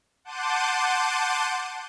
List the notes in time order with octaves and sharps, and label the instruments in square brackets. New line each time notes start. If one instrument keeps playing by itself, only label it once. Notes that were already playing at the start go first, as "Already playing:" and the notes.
[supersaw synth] F#5 A5 C6 D6 G6 D#7